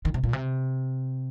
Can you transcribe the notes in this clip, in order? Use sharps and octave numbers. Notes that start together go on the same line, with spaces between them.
D#3
C3
A#2
C3